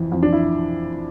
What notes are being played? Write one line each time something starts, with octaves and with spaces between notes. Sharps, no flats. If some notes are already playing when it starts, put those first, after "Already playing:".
Already playing: F2 E3
F2
D4
E4